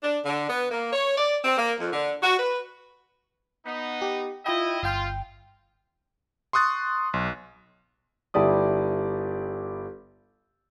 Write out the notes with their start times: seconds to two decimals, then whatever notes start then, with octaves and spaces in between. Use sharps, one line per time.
0.03 D4
0.25 D3
0.49 B3
0.71 A#3
0.93 C#5
1.18 D5
1.44 C4
1.58 A#3
1.80 F2
1.93 D3
2.22 F#4
2.39 B4
3.66 B3 D#4
4.02 G4
4.46 E4 F4 D#5 G5
4.83 G1 F4 G5
6.53 C6 C#6 D#6 F#6 A6
7.14 B1
8.34 G1 E4 G4 D5 D#6